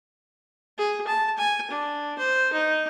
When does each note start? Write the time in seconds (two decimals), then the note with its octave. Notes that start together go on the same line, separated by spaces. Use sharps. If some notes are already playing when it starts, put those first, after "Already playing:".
0.78 G#4
1.07 A5
1.37 G#5
1.70 D4
2.18 C5
2.53 D#4